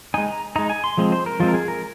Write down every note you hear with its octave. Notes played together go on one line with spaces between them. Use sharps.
G#3 D#4 G#5
A#5
G#3 D#4 A#5
G#5
C6
F3 G#3 C4
C5
A#4
F3 G#3 C4 F4
A#4
G#4
A#4